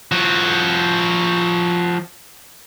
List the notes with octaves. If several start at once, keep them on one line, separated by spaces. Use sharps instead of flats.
F3 F#4